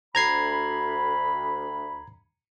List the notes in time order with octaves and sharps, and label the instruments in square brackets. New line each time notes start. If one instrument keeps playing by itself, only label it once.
[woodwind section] D2 B5 [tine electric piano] A#5 G#6 C7